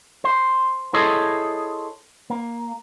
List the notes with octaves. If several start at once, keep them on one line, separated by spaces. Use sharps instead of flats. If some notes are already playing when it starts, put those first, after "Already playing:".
C5
E4 G#4 A4 C5 C#5 D#5
A#3